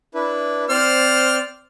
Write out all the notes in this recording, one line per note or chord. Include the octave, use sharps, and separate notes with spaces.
D4 E4 B4
C4 C5 D5 F6